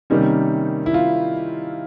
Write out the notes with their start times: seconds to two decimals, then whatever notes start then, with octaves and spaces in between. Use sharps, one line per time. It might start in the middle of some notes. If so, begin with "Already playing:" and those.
0.10 C3 D#3 G3 A#3 C#4 D#4
0.86 E4
0.94 F4